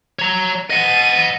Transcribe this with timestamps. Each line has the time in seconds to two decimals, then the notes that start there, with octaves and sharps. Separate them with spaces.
0.19 C#5 A#5
0.70 D#5 F#5 A6 D#7